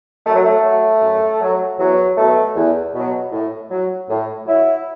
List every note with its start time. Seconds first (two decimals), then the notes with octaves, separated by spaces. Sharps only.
0.25 F#2 A3
0.33 F#3
0.42 A3
0.63 F#3
1.02 F#2
1.41 F#3
1.78 E2 F#3
2.16 B2 F#3 A3
2.55 E2
2.94 B2 F#3
3.32 A2
3.70 F#3
4.08 A2
4.46 F#3 E4